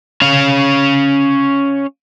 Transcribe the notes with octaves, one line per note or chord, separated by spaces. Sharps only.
C#4 F5